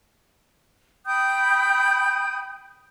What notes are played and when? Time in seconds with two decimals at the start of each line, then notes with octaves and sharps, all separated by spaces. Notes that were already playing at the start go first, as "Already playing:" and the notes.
1.06 G5 B5 D#6 G6